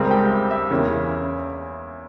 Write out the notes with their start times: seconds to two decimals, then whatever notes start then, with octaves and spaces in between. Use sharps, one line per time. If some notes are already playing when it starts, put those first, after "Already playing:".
Already playing: C#2 C#3 G3 C4 A#4 A#5
0.11 G4 G5
0.31 E5
0.51 E5
0.70 E2 C#3 E3 A#3 C#4